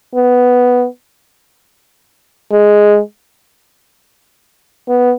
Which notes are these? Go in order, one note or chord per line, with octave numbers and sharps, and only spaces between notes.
B3
G#3
B3